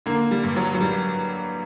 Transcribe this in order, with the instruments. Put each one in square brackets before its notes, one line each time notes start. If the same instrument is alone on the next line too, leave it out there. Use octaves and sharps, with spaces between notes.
[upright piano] D3 A#3
G3
G2
F#3
F#3
G2 G3